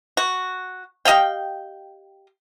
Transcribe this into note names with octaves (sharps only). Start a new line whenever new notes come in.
F#4
G4 D#5 F5 G5